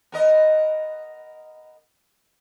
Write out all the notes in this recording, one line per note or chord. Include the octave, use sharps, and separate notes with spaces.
B3 A#4 D#5